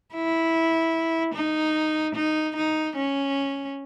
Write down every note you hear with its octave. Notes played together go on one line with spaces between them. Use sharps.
E4
D#4
D#4
D#4
C#4